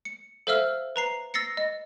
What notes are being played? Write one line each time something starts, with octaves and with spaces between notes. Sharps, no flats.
C#7
A4 C5 E5 F5 E6 F6
B4 A#5 C7
E6 A6 A#6 C7 C#7
D#5